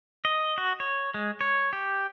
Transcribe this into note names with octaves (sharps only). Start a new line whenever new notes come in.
D#5
F#4
C#5
G#3
C#5
G4